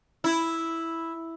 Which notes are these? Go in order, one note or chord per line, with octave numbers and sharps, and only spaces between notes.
E4